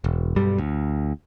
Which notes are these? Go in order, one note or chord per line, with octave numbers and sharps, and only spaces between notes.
E1
B1 G2 G3
D2